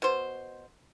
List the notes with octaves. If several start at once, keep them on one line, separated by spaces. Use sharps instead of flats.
B2 C5